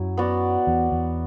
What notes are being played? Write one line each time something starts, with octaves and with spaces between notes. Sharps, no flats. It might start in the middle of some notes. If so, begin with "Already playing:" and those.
Already playing: F#2 F#3 E4
B3 F#4 D5
E2
E2